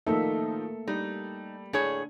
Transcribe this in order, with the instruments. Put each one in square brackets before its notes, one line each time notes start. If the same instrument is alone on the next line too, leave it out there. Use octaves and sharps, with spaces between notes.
[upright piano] D#3 F3 D#4 [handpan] A3 A#3 E5 [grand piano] A4
[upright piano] G3 [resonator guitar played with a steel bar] D#4
[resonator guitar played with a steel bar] A2 G#4 C#5 [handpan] D4